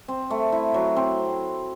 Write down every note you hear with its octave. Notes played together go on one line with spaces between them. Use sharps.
C4
A3
E4
F#3
C4